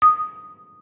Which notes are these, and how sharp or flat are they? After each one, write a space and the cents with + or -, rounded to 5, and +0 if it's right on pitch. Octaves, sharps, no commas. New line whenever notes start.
D#6 -10